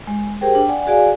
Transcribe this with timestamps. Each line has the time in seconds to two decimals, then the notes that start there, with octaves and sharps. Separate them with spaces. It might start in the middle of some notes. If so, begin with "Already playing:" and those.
0.07 G#3
0.41 G4 G#4 A#4 C5 G5
0.55 D4 G5
0.69 D5 F#5 G#5
0.87 F#4 G#4 D5 F5 G#5